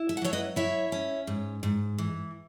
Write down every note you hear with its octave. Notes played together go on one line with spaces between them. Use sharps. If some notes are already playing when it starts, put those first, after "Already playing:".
Already playing: E4
E5
F#5
F#3 C#5 E5
B4 D#5
E4 C#5 E5
C#4
G#2
G#2
E3